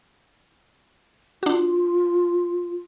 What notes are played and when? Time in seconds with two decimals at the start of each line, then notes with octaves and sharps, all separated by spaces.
1.43 D4 F4 F#4